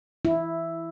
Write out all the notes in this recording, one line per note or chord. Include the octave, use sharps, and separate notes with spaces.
E4